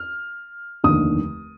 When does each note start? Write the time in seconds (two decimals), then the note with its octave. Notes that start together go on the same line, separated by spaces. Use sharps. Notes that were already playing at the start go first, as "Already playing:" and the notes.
Already playing: F6
0.84 F1 D#2 D3 D#6